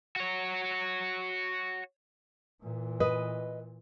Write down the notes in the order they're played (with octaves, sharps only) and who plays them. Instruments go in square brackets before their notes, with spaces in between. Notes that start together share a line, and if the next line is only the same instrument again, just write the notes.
[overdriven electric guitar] F#4 C#5
[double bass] A#2 E3
[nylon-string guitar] B4 D#5